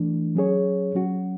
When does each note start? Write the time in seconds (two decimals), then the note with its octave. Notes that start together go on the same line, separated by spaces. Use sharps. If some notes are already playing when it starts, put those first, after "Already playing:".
Already playing: E3 A3 D4
0.35 F#3 C#4 G#4 C#5
0.94 F#3 C#4 F#4